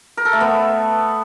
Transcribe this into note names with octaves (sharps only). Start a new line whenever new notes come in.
A#4
A4
A3
B3